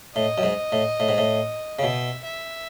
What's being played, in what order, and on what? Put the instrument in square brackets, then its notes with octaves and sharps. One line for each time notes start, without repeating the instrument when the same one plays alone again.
[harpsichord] A2 [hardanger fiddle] D#5
[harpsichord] F#2
G#2
A2
A2
G#2
A2
C#3
[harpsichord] B2 [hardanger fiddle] E5
[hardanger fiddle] E5